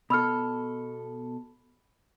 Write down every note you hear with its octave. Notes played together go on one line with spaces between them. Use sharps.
B2 A4 B5 E6 F6